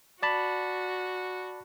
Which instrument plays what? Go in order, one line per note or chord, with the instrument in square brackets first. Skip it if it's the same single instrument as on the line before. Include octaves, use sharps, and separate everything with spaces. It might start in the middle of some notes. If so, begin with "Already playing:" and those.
[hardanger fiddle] F#4 [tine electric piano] D5 A5 B5